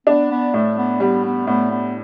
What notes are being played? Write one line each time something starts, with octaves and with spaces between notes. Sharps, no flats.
B3 D4
B3
A2 A3
B3
G3 B3
B3
A2 B3
B3